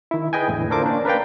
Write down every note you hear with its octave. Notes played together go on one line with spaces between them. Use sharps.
D#3 E4
G#4 B4 D#5 G5 G#5
E2 A2 D3
D4 F4 A4 A#4 C5 D6
A#3 C#4 D4
A#4 B4 D5 F5 G5